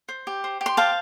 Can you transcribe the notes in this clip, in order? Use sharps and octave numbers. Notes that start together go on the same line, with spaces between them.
C5
G4
C5
G4
C6
C5 F5 A5